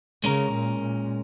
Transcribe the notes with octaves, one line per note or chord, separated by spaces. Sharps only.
C#3 G#3 C#4 A#4
A#2
A#2